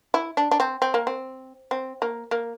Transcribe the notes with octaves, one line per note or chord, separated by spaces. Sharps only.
E4
D4
D4
C4
C4
A#3
C4
C4
A#3
A#3